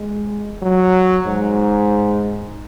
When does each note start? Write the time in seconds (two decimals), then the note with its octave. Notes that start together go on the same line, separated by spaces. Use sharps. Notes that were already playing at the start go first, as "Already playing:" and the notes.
Already playing: G#3
0.62 F#3
1.26 G#2